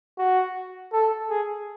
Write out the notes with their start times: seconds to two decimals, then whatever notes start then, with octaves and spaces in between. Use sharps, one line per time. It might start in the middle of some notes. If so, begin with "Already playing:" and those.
0.18 F#4
0.93 A4
1.30 G#4